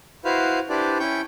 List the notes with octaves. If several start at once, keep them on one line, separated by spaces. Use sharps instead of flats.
E4 F#4 B4 C5 F5
D4 E4 G4 B4 C5 D5
C#4 E4 G5 C#6 G6